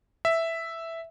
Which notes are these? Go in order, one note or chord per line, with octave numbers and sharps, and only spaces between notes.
E5